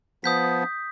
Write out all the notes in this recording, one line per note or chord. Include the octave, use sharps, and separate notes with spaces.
F3 B3 D#6 G6 B6